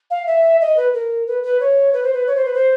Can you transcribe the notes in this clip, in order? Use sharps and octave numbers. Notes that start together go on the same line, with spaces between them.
F5
E5
D#5
B4
A#4
B4
B4
C#5
B4
C5
B4
C#5
C5
B4
C5